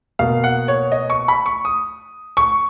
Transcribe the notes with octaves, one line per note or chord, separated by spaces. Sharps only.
B2 A#3 F5
F#5
C#5
D#5
C#6
B5
C#6
D#6
C#6